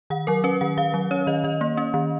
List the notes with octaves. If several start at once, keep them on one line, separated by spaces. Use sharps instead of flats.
D#3 F#5
F#3 A#4
C#4 B4
D#3 F#5
D#3 F5
F#3
C#4 C#5
D#3 D#5
D#3 D#5
A#3
C#4
D#3